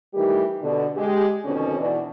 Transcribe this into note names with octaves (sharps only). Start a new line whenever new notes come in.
D#3 E3 G3 A3 G4
B2 D3
G#3 G4
F2 B2 D3 D#3 C#4
B2 E3 D4